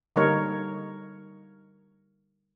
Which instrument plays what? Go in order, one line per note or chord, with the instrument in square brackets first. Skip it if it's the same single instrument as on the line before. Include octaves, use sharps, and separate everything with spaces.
[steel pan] D3 G3 A#3 D#4 A#4 C#5